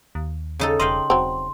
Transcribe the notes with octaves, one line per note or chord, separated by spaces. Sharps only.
D#2
C#3 D#4 A4
E1 D#5 F5 G5 C6
E1 F#3 C4